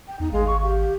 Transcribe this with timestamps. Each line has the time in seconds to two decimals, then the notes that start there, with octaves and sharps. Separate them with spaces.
0.08 G5
0.20 E2 D#4
0.32 G#1 G#3 F5
0.47 C#6
0.63 G4 F5